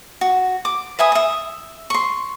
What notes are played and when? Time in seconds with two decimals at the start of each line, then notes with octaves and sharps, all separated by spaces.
0.21 F#4
0.65 D6
0.99 B4 E5 G#5 D#6
1.12 E5 D#6
1.90 C6 C#6